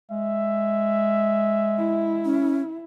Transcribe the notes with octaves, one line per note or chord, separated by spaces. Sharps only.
G#3 E5
E4
C#4